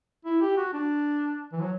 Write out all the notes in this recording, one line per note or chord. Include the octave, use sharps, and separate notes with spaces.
E4
G4
F#4
D4
E3
F#3